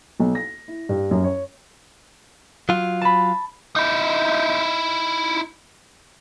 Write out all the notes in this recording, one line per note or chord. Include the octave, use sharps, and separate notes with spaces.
B1
A#6
E4
G2
F#2
C#5
F#3 F4
A5 B5
D#4 E4